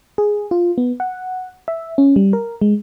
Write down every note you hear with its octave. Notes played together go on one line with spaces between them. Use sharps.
G#4
F4
B3
F#5
E5
C#4
G3
A#4
G#3